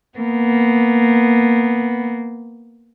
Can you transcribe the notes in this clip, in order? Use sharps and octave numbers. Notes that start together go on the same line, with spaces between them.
A#3 B3